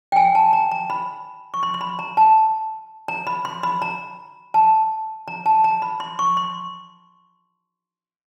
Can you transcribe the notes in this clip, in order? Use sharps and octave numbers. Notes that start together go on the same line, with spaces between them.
G5
G#5
A5
A#5
A#5
B5
C#6
C6
C6
B5
A#5
A5
A#5
B5
C6
B5
A#5
A5
A#5
A5
A#5
B5
C6
C#6
C6